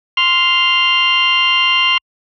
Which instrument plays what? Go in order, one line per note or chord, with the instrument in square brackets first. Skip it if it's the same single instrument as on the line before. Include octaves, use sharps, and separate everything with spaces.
[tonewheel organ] C6 F6